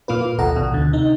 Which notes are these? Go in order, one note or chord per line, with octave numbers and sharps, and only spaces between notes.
A#2 A#3 F4 B4
F4
A1 D#2 B2 A4 F#5 A#5
A#1 B2
D2 D3
C3 D#4